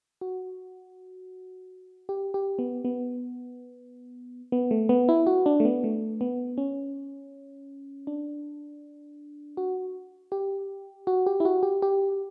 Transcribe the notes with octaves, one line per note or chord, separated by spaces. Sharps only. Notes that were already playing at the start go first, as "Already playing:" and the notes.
F#4
G4
G4
B3
B3
B3
A3
B3
E4
F#4
D4
A3
B3
A3
B3
C#4
D4
F#4
G4
F#4
G4
E4
F#4
G4
G4